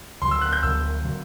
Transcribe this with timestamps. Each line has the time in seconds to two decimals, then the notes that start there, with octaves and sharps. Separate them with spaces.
0.22 D2 D3 F#3 C6
0.31 E6
0.41 F#6
0.52 G6
0.63 D2 D3 F#3 E6
1.04 D3 F#3